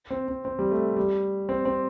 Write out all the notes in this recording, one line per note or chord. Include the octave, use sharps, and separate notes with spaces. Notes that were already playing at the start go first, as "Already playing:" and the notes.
C4
C4
C4
G3
A3
G3
C4
C4